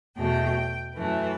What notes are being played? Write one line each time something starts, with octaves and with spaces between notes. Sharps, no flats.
E2 B2 A3 G5
F#2 E3 A3 B4